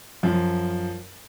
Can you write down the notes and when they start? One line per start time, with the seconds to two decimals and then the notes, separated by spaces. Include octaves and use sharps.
0.23 F#2 F3